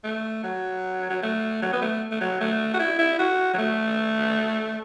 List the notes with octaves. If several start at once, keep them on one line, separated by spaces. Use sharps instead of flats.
A3
F#3
F#3
A3
F#3
B3
A3
A3
F#3
A3
F#4
E4
E4
F#4
F#3
A3